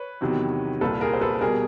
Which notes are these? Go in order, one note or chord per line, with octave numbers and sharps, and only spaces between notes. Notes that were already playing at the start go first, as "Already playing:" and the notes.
Already playing: B4 C#5
E2 C3 D#3 F#3
C2 A#2 G3 A4 B4
G#4 A#4
C5
A4 B4
B2 G3 G#4 A#4